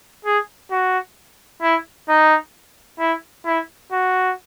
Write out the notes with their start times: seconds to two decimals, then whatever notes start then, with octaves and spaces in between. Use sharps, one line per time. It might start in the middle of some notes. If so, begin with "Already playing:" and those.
0.25 G#4
0.71 F#4
1.62 E4
2.09 D#4
3.00 E4
3.45 E4
3.92 F#4